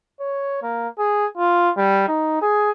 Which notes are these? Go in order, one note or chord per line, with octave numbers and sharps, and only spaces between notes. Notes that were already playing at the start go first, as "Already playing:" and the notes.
C#5
A#3
G#4
F4
G3
D#4
G#4